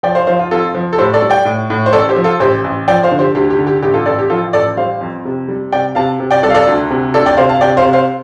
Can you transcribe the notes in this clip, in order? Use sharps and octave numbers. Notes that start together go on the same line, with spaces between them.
F3 D5 G5
C5 F5
F3 C5 F5
F4
F2 F4 A4
F3
A4
A2 G4 C5
A4 D5
G3
D5 G5
A2
A2
C5
A1 A4 D5
G4 C5
F3
F4 A4
A1 G4 C5
A1
F3 D5 G5
C5 F5
D3
G4 C5
D2 G4
G4
D3
G4
A1 G4
F4 A4
A1 A4 D5
G4
F3 F4 A4
A1 A4 D5
G3 C5 F5
F2
C3
G3
C3 D5 G5
C3 F5 A5
C3
D5 G5
C2 A4 D5
F5
A4 D5
D2
C3
D2 A4 D5
D5 G5
C3 C5 F5
F5 A5
C3 D5 G5
C5 F5
C3
C5 F5